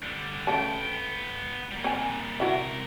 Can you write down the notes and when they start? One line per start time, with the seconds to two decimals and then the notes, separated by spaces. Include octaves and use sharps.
0.03 D3 G3
0.47 C#3 A3 B3 G5 A5
1.71 G3 A#3
1.84 C4 G#5
2.40 C3 E4 F#4 A#4 E5